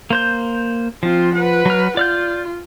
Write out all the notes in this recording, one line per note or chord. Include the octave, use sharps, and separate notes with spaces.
A#3 C5 G6
F3 C4 F4
B4 F#5
F#3 F6
F4 D5 F6 G6